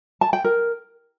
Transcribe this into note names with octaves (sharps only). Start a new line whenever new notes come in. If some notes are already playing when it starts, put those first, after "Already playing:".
A5
G5
A#4